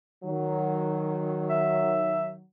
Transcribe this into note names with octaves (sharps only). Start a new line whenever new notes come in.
D#3 F#3
E5